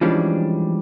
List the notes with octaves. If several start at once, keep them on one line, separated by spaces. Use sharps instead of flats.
E3 F3 G3 G#3 C#4 D4